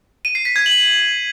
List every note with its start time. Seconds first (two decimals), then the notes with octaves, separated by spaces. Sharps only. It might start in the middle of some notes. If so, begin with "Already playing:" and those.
0.25 D#7
0.35 C7
0.45 B6
0.56 G#6
0.66 F#7